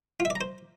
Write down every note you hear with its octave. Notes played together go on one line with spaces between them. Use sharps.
F4
E5
D5
A#5
C5